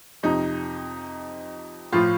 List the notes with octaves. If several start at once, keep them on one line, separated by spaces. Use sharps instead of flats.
F2 C3 F3 D#4
A2 F3 F4